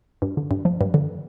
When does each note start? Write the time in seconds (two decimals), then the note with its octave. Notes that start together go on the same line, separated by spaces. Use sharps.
0.22 G2
0.37 D3
0.51 G2
0.65 F3
0.81 G2
0.94 D3